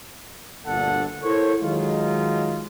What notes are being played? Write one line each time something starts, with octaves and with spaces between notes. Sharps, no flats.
G1 D2 A#2 D4 A4 F#5
E4 A4 A#4 C5 C#5
D#3 F#3 G#3 D#4 F4